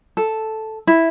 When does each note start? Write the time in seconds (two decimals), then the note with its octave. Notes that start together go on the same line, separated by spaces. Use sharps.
0.17 A4
0.87 E4